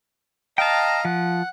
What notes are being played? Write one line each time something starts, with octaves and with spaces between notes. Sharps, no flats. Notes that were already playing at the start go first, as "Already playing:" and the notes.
D#5 F5 G5 A5 A#5
F3 F#5